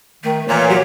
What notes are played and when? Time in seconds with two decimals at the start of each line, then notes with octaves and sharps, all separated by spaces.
0.24 D#3 A3
0.48 A#2 E3 C#5
0.70 F#3 G4